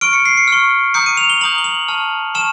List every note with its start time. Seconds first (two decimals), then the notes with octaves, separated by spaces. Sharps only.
0.01 C#6 F6 D7
0.13 C#7
0.25 C7
0.37 C#7
0.48 C#6 F6
0.94 A#5 D#6 G6 C#7
1.06 D#7
1.17 F7
1.30 G7
1.41 A#5 D#6 G6 F#7
1.58 G7
1.64 F#7
1.88 A5 C#6 F6
2.35 A5 C#6 F6 E7